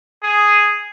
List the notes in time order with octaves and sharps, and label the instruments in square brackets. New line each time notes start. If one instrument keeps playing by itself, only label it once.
[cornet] G#4